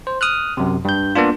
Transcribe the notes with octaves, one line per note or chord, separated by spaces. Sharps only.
C5
D#6 F6 F#6
F#2 C3
G2 G6
A#3 B3 D4 F4